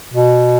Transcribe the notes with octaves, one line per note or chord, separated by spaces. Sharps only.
B2